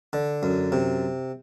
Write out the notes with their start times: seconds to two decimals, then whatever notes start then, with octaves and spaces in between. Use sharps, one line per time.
0.13 D3
0.43 F#2
0.72 C3